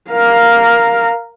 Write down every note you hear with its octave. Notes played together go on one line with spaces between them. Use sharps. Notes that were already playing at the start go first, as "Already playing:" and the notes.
A#4 F5